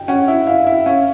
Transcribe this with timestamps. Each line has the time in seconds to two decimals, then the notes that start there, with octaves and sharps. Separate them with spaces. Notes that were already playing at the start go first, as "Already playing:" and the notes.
Already playing: G5
0.08 C#4 F#5
0.28 E4
0.47 E4 F5
0.67 E4
0.86 C#4 F5